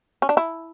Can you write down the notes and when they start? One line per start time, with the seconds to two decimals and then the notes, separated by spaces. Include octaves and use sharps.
0.22 C#4
0.29 D4
0.37 E4